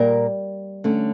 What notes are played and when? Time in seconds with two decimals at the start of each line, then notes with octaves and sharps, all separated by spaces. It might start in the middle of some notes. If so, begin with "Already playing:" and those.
Already playing: A#2 G3 A#3 A#4
0.84 D3 A3 C#4